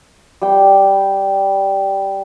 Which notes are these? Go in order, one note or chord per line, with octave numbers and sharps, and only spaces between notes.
G3 G5